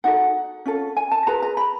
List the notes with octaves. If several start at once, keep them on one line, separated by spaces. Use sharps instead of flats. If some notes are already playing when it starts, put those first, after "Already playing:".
D#4 F#4 A4 F#5
C#4 F4 A4
G#5
A5
F4 G#4 B4 A#5
A#5
B5